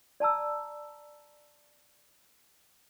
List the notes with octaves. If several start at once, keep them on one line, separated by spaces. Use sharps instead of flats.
D5 A5 A#5 E6